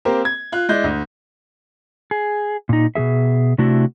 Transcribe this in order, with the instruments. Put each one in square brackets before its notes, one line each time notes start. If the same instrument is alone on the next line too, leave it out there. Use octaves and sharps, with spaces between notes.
[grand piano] A#3 C4 G4 A#4 C5
G#6
F4 F#6
G#3 E4 D5 G6
D2
[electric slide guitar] G#4
A#2 D#4
B2 F3 G#4 E5
C3 A3 D4 E4 F#4